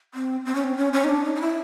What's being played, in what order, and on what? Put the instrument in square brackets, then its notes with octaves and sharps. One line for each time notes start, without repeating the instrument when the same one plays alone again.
[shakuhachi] C4
C4
C#4
C4
C#4
C#4
D#4
D4
D#4
D#4
E4